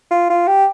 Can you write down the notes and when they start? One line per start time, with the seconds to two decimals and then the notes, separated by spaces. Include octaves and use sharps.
0.11 F4
0.30 F4
0.47 G4